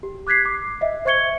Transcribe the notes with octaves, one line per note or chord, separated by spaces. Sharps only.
G4
D6 F#6 G#6 B6 C7
D6
D#5 E5
C5 E5 C#6 G#6 C#7 G7